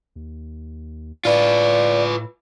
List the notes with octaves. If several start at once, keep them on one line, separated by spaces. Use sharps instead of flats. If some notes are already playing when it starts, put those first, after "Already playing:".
D#2
A2 F4 B4 D5